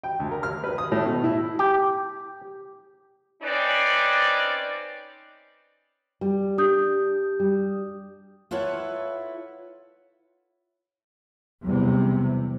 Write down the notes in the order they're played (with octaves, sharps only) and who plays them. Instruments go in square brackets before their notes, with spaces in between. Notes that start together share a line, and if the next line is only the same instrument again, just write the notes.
[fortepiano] G5
D2
A#4
F6
B4
D#6
A2
B2
E4
[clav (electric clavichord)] G4
[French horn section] C4 C#4 D#4 B4 D5
[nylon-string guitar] G3
[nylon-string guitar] D4 [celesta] G4 D#6 G6
[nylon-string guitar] G3
[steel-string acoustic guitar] E4 F4 A4 B4 C#5 F#5
[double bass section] E2 C3 [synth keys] F#3 G3